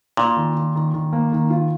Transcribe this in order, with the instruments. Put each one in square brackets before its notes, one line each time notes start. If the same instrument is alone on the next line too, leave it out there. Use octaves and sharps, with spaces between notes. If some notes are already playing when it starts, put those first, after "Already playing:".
[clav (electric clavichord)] A#2 [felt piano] F4
[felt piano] D#3
D#3
D#3
D#3
A#3
D#3
F4